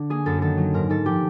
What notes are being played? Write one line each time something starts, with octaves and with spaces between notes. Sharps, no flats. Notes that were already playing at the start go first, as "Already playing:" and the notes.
Already playing: D3
A#3 G#4
F#2 A4
D#3 A4
F#3
G#2 A#4
G#2 A4
F3 G4